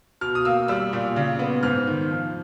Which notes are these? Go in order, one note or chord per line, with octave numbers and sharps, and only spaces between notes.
B2 F6
D#6
A#3 E6
G3 E6
A#2
C#3
B3
G#2 F6
D#3
F3